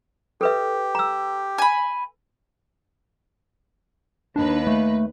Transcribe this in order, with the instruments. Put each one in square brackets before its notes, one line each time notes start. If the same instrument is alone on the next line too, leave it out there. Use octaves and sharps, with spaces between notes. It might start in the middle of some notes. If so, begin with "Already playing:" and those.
[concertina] G4 [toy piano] A4 B4 E5
[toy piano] A#5 E6
[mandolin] G#5 B5
[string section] D#2 B4 [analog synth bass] D4
[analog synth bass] A3